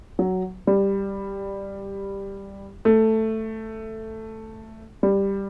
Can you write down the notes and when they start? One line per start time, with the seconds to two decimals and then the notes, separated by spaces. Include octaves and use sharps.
0.19 F#3
0.67 G3
2.85 A3
5.03 G3